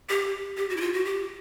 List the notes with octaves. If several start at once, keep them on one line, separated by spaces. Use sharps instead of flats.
G4
G4
F#4
E4
F4
F#4
G4